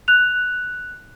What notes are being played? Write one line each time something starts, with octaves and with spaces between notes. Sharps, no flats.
F#6 F7